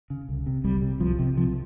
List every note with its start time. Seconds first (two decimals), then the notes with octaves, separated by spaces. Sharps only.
0.10 C#3
0.29 C2
0.46 C3
0.64 C2 G3
0.82 C3
1.00 C2 F3
1.19 C3
1.36 C2 F3